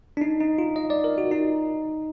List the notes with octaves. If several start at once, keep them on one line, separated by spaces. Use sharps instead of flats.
D4
D#4
D#4
F4
D#5
D5
A#4
F#4
D#4